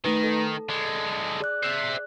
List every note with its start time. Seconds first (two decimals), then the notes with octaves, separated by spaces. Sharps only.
0.05 D#3 A3 D#4 B4
0.24 A4
0.69 D3 G#3
1.40 G#4 D5 F#6
1.63 C5 E5